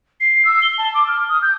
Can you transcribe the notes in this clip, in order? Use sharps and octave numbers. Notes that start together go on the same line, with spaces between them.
C7
E6
G7
A5
D6
F6
D#6
G6